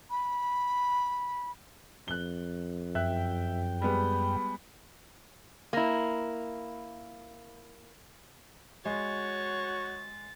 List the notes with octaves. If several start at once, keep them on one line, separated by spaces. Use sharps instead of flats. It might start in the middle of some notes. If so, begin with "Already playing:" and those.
B5
F2 F#6 G7
F#2 E5 G5 F#6
G3 G#3 B3 B5
A#3 E4
G#3 F#4 C#5 A6